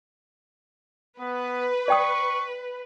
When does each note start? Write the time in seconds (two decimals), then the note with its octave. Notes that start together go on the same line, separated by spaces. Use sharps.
1.20 B3 B4
1.88 D5 G5 C#6 D#6